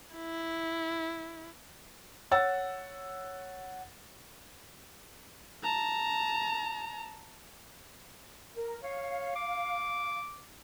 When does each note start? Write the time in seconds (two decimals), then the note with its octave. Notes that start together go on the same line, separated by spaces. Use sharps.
0.15 E4
2.31 C#5 F#5 E6 A6
5.63 A5 A#5
8.56 A#4
8.83 C#5 F5
9.35 D6